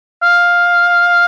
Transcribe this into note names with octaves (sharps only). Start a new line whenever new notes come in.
F5